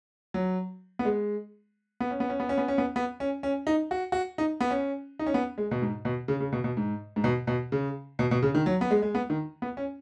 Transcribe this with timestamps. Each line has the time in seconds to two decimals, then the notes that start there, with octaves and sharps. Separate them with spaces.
0.34 F#3
0.99 B3
1.05 G#3
2.00 B3
2.11 C#4
2.20 B3
2.29 C#4
2.40 B3
2.49 C#4
2.58 B3
2.68 C#4
2.78 B3
2.96 B3
3.20 C#4
3.43 C#4
3.67 D#4
3.91 F#4
4.12 F#4
4.38 D#4
4.61 B3
4.71 C#4
5.19 D#4
5.26 C#4
5.34 B3
5.58 G#3
5.71 B2
5.82 G#2
6.05 B2
6.28 C#3
6.40 C#3
6.53 B2
6.64 B2
6.77 G#2
7.16 G#2
7.24 B2
7.47 B2
7.72 C#3
8.19 B2
8.31 B2
8.43 C#3
8.55 D#3
8.66 F#3
8.81 B3
8.91 G#3
9.02 G#3
9.15 B3
9.30 D#3
9.62 B3
9.77 C#4